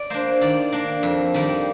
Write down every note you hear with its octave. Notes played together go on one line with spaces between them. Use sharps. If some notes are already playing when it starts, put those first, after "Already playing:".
Already playing: D5
A#3 D4 C5
D#3 D5
A#3 D4
F2
D#3 G3 A#3